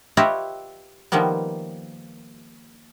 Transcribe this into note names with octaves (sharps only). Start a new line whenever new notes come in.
F4 G4 B4 C#5 D#5 E5
D#3 F3 G3 A#3 B3